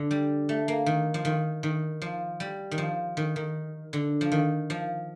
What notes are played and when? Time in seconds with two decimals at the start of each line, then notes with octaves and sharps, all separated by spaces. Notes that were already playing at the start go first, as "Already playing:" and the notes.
Already playing: D3
0.11 G3
0.49 A3
0.68 A#3
0.86 D#3
1.14 F3
1.25 D#3
1.63 D#3
2.02 F3
2.40 G3
2.71 D#3
2.78 F3
3.17 D#3
3.36 D#3
3.93 D3
4.21 F3
4.32 D#3
4.70 F3